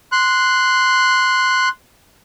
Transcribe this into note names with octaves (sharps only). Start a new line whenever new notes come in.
C6 F#6